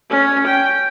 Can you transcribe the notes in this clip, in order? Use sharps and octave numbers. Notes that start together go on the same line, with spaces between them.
C#4
G5